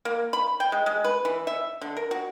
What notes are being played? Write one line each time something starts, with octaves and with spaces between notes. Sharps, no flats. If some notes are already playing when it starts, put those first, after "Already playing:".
A#3
B5
G5
G#3
G#3
B4
E3
E5
D3
A#4
F#4